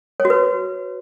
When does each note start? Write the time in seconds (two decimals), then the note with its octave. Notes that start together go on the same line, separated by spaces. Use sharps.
0.20 C#5
0.25 F#4
0.30 B4